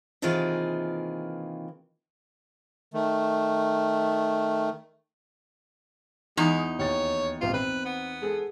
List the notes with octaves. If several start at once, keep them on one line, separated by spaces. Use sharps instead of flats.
C3 D#3 E3 A#3 F4 G#4
D#3 A3
E2 G#3 D#4
D#2 C#5 A6
A#1 G#2 C3 F4
C4 B4
B3
G#3 G#4 A4